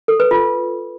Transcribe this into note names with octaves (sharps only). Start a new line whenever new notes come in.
A4
B4
F4